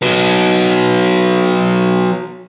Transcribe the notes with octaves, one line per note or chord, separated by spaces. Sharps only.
F#3 B3